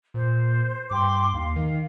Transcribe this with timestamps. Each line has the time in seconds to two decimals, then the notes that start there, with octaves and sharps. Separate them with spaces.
0.14 A#2 C5
0.91 G2 G5 C6 D6
1.33 D#2 F5
1.56 D#3